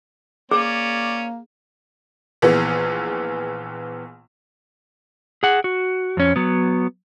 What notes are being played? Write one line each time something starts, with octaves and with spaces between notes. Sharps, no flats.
A#3 C#4 G#4 D5
A#1 E3 B3 G#4
G#4 F#5
F#4
F2 C#4
F#3 B3